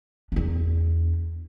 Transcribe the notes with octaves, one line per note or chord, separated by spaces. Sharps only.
E2 D4